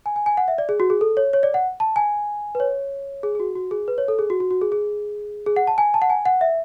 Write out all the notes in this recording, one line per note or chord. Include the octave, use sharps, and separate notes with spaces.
G#5
G#5
G#5
F#5
E5
D5
G#4
F#4
G#4
A4
C#5
C#5
D5
F#5
A5
G#5
B4
C#5
G#4
G#4
F#4
F#4
G#4
B4
C#5
A4
G#4
F#4
F#4
F#4
G#4
G#4
G#4
F#5
A5
G#5
A5
F#5
G#5
F#5
E5